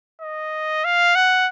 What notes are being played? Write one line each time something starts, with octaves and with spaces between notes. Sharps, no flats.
D#5
F5
F#5